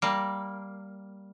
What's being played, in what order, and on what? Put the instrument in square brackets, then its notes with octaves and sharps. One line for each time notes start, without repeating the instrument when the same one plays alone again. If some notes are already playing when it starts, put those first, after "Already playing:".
[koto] G3 A#3